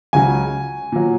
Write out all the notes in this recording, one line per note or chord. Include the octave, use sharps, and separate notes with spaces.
C#2 C#3 F#3 G#5
A#2 F#3